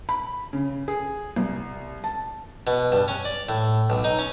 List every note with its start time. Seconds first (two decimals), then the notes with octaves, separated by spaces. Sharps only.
0.09 B5
0.53 C#3
0.88 G#4
1.36 C2
2.04 A5
2.67 B2
2.92 G2
3.08 C#4
3.25 D5
3.49 A2
3.90 B1
4.04 D#4
4.19 C#4